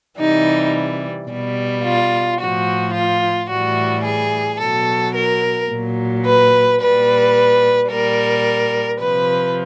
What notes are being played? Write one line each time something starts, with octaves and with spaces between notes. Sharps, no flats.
C3 E3 G3 D#4
B2 G3
F4
A2 F3 F#4
F4
A2 E3 G3 F#4
G#4
B2 F#3 A4
A#4
A#2 F#3
B4
A#2 G3 B4
A#2 G3 A#4
C3 F3 B4